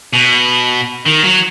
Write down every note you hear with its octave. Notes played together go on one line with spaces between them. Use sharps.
B2
D#3
F#3